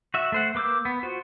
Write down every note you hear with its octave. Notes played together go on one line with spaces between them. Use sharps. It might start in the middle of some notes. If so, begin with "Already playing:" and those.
F#4 E5
A3 C5 F#5
A#3 B4 D6 E6 G6
B3
F4 F#4 C5